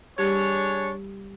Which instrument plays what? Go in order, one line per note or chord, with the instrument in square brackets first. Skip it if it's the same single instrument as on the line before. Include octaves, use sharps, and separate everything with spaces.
[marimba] G3 G4 G#6 [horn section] D4 G#4 C#5